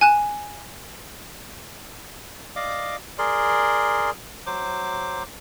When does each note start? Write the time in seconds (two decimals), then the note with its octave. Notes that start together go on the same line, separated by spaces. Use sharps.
0.01 G#5 F#6 E7
2.56 D5 D#5 F5 D6
3.18 G#4 A#4 D5 C6
4.46 F#3 C5 D6